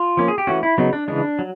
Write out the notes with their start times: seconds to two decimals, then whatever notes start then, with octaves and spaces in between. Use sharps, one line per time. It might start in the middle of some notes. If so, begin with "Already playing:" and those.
Already playing: F4
0.17 F3 A#3 C#4
0.28 G#4
0.38 G4
0.47 E3 A3 C#4 F#4
0.63 E4
0.78 C#3 F#3 B3 D#4
0.93 D4
1.08 C#3 E3 G#3 D4
1.39 F#3